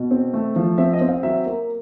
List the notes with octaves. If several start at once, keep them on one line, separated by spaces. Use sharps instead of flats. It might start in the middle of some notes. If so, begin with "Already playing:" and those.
Already playing: B2
C4
A3
F3
C4 E5
D#5
C4
F5
F#3 E5
A#3